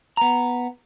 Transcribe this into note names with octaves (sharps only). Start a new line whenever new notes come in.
B3 A#5